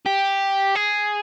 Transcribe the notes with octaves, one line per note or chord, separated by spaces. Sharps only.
G4
G#4